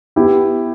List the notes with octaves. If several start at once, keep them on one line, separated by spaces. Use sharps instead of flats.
B3 E4 G4